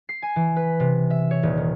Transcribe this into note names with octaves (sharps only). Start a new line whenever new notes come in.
C7
G#5
E3
B4
C3
E5
C#5
D#1
D#3